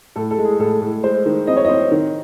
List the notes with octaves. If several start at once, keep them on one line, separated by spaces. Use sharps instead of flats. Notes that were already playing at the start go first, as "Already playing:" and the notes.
A2 A4
A4
G#3
G#4
A2 A4
A2
G#3 C5
D#3
C4 D#5
C#5
C4 D#5
D#3